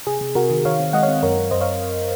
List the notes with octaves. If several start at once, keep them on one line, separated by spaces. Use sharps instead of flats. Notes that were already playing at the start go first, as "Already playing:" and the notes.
C3 G#4
C3
C3 F#4 A#4
D#3
D#3 C#5 F5
C4
G#3 D#5 F#5
C#5 F5
C4
F#2 A#4 C#5
C4
F#2 C5 D#5
C#5 F5